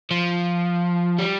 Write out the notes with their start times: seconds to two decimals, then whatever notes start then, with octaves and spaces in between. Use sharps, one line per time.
0.11 F3
1.19 G3